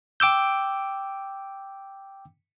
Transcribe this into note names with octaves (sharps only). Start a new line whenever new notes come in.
G5 D6 E6 G6